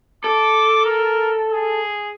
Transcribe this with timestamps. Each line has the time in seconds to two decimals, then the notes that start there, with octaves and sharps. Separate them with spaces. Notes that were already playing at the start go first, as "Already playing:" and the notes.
0.24 A4 D6
0.85 A#4
1.52 G#4